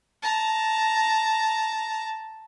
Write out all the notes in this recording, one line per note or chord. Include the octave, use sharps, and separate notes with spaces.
A5 A#5